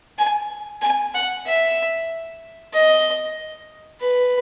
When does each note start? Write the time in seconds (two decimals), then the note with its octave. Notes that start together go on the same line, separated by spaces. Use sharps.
0.18 G#5
0.82 G#5
1.15 F#5
1.46 E5
2.74 D#5
4.01 B4